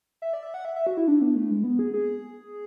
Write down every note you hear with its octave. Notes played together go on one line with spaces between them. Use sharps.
E5
D5
E5
F#5
E5
E5
F#4
E4
D4
B3
A3
G#3
B3
G#4
G#4